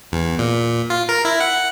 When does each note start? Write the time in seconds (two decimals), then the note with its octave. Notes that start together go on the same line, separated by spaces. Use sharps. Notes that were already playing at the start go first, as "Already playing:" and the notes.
0.12 E2
0.39 A#2
0.90 F4
1.09 A#4
1.25 E4
1.40 F#5